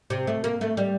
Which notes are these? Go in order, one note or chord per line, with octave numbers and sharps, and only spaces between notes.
C3
A3
A#3
A3
G3